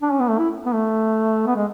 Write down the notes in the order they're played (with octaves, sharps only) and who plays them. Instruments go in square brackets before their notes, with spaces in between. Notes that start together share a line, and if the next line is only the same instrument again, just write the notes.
[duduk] D4
C#4
B3
A3
E4
B3
A3
B3
G#3